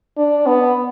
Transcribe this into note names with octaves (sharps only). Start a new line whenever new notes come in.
D4
B3